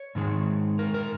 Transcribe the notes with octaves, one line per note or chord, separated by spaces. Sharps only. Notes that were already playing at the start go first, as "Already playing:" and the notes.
Already playing: C#5
G#2 D#3 G#3
A#4
A#4